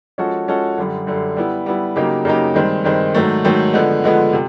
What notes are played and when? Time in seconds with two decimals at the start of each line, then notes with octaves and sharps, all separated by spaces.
0.18 F3 G#3 C#4 F#4 A4
0.48 F3 G#3 C#4 F#4 A4
0.78 F#2 D3 G3
1.07 F#2 D3 G3
1.37 G3 B3 E4
1.66 G3 B3 E4
1.96 C#3 F#3 A#3 D#4 G4
2.25 C#3 F#3 A#3 D#4 G4
2.55 G2 D#3 G#3 C4
2.84 G2 D#3 G#3 C4
3.14 G#2 D#3 F#3 A3
3.44 G#2 D#3 F#3 A3
3.73 D3 F3 G#3 B3
4.04 D3 F3 G#3 B3
4.33 C3